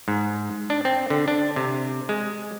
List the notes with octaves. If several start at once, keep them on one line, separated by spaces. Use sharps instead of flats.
G#2
D4
C4
D3
D4
C3
G#3